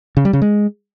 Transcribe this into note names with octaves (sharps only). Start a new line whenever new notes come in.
C#3
G3
C#3
G#3